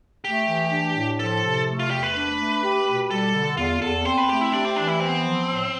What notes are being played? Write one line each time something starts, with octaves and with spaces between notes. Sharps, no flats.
A3 G4
E3
D4
A2
F3 A4
C3
A3
F4
E2 G4
B4
D4
A3
G4
B2
G3 A4
D3
E2 F4
E2 A4
C4 C5
B4
A3 G4
E4
D4 G4
C4
E3 D4
E4
B3 C4
F3
A2